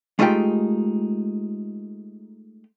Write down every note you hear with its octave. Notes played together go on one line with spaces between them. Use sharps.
G#3 A3 D#4 F4 G4 G5